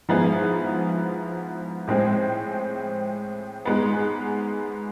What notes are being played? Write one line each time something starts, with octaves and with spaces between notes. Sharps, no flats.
G#2 F3 B3 E4 G#4
A2 G#3 C4 G#4
G#2 G#3 B3